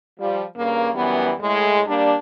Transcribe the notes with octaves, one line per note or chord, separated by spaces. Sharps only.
F3 G3
G2 C#3 A#3
F#2 E3 G3 B3
A2 G#3
G3 A#3 D4